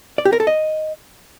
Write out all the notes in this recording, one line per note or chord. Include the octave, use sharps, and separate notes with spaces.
D5
G4
A#4
A4
D#5